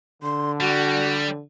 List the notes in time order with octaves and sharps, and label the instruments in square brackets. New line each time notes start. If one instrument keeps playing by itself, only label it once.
[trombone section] D3 [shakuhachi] C6
[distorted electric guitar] G3 [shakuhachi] F#4